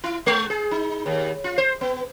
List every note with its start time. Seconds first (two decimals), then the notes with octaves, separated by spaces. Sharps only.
0.04 E4
0.26 G#3
0.50 G#4
0.71 D#4
1.06 D#2
1.44 F4
1.58 C5
1.81 B3